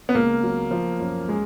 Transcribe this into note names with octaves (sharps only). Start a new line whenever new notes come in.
B3
C#2 A#3
F#3
F3
F#2
G#3